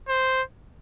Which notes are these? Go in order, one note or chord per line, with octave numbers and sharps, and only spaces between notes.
C5